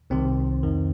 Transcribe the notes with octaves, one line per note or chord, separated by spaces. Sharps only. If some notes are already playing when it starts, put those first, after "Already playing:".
C2 C3 D#3 C4
F2 D#3